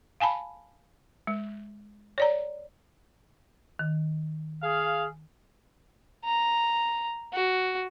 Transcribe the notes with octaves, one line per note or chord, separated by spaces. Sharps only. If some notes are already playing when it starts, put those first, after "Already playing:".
F5 G#5 A5 B5
G#3
C#5 D5 A#5
D#3
G#4 F5
A#5
F#4